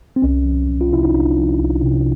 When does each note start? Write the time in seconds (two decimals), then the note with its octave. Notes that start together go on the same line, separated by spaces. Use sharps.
0.16 C4
0.22 C2 C#4
0.45 F3
0.68 C2
0.81 F4
0.92 C3 E4
1.03 D#4
1.14 C2 D4
1.38 F3
1.60 C2
1.83 C3